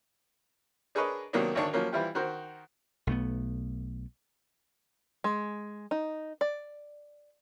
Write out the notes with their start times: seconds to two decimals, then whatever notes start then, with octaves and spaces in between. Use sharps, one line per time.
0.95 D4 G#4 A#4 B4 C#5 D#5
1.33 C3 D#3 F#3 A#3 B3 D4
1.55 G#1 D3 D#3 D4 C#5
1.73 F3 F#3 A#3 C#4
1.92 E3 G3 E4 F4 G4
2.15 D#3 F#4 A#4 C5
3.07 B1 A3 B3
5.24 G#3
5.91 D#4
6.41 D5